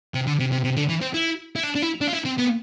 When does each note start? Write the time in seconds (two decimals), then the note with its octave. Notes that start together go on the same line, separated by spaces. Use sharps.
0.14 C3
0.27 D3
0.39 C3
0.52 C3
0.64 C3
0.77 D3
0.89 E3
1.01 C4
1.14 E4
1.56 E4
1.63 D4
1.75 D4
1.82 E4
2.01 D4
2.08 F4
2.13 E4
2.25 C4
2.38 B3